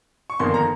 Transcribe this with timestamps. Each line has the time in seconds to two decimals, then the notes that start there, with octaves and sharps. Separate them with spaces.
0.30 C#6
0.39 G1 F2 D#3 A#3 C6
0.54 A#5